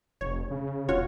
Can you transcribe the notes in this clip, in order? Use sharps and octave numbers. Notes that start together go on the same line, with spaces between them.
F1 C#5
C#3
E1 F4 F#4 C#5